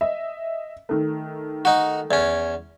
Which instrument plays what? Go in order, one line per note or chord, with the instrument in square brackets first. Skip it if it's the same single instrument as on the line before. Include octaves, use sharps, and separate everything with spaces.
[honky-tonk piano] D#5 E5
D#3 A3
[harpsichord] D#4 F#4
E2 C#4